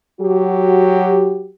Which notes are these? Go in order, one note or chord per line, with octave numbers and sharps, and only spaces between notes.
F#3 F#4 G4